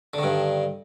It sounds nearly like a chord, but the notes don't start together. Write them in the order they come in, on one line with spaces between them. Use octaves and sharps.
D3 D#3 G2